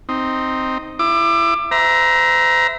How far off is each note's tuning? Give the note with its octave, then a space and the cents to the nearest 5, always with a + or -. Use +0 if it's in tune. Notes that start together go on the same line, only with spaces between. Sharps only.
C4 +0 D#4 +0
E4 +25 D6 +25
C5 -40 E5 +0 A#5 +15